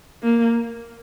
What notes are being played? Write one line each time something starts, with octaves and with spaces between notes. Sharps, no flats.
A#3